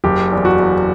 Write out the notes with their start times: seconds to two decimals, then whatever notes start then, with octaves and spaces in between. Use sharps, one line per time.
0.04 F#1 G4
0.32 E2
0.45 F#4
0.59 E2